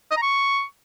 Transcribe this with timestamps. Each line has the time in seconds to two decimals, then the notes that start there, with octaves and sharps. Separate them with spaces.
0.11 D#5
0.17 A#5
0.22 C#6